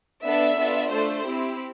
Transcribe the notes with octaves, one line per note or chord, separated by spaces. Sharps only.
B3 D4 A4 E5
B3 D4 F4 A4
A3 D4 A4 C5
C4 E4 G4